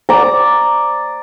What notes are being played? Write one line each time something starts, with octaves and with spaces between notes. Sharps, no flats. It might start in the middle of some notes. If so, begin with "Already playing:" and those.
D5 A#5